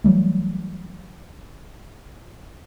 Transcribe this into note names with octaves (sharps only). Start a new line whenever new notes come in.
E3 F#3 G3 A3